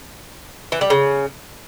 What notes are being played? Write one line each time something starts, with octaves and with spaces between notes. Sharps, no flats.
E3
G3
C#3